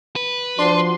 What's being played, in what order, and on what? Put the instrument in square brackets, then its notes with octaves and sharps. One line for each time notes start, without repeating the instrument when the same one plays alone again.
[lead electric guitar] B4
[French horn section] F3 F#4 [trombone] D4 [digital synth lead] C6